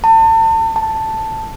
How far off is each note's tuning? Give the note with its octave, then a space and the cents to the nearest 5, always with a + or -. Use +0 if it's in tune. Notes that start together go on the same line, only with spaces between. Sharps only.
A5 +35
A5 +5